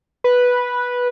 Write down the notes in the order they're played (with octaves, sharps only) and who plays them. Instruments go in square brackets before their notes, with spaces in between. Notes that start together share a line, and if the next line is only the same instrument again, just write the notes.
[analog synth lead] B4